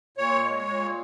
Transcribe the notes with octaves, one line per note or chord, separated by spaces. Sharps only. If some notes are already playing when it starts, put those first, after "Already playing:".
A#2 C#5
G#3
A#2